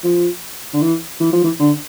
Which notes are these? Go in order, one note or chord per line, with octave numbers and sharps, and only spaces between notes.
F3
D3
E3
E3
F3
E3
D3